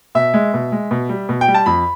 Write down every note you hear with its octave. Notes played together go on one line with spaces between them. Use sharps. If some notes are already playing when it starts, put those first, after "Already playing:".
B2 E5
G#3
B2
G#3
B2
G3
B2
G5
G3
A5
F2 B5